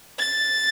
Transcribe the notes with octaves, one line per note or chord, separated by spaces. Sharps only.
A6